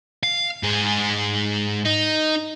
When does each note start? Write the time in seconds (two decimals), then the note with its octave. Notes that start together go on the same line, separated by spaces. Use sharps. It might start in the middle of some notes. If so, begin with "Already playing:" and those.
0.23 F5
0.63 G#2 G#4
1.86 D#4